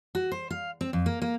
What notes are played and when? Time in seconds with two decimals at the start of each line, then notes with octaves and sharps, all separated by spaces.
0.15 F#4
0.32 C5
0.51 F5
0.81 C4
0.93 F2
1.06 A#3
1.22 A#3